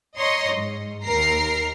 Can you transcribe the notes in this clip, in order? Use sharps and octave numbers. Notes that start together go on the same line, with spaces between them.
C#5 D#5 A#5 C6
G#2
D#2 A#4 A#5 F6 C7